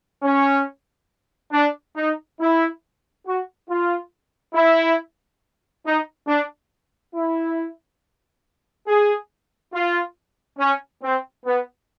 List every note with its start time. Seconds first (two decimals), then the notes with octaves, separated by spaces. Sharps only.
0.23 C#4
1.52 D4
1.95 D#4
2.39 E4
3.25 F#4
3.68 F4
4.54 E4
5.85 D#4
6.27 D4
7.14 E4
8.87 G#4
9.73 F4
10.58 C#4
11.02 C4
11.45 B3